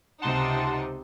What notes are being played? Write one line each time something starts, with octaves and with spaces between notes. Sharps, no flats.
C#2 C3 D#4 F#5 A5 C6